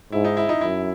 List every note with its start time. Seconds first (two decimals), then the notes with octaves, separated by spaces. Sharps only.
0.12 G#2 E4
0.24 D#4
0.37 E4
0.49 D#4
0.61 F#2 E4